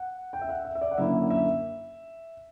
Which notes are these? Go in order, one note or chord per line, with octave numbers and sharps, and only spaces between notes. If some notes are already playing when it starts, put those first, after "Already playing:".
Already playing: F#5
G5
E5
F#5
E5
E5
D5
F#5
F#2 D3 A#3 C#4 E4 E5
E5